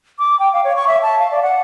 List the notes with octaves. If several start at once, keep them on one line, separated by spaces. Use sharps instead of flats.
D6
G5
F5
C#5
C#6
E5
A5
F5
D5
F#5